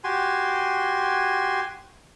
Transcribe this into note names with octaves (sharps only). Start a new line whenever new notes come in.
F#4 G4 G#5 C6